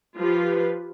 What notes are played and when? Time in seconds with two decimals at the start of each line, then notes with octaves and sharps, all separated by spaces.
0.17 F3 F4 G4 B4